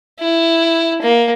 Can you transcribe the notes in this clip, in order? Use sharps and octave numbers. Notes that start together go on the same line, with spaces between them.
E4
A#3